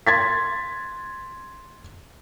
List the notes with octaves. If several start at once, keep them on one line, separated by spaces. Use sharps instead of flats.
C6 G#6 A6 B6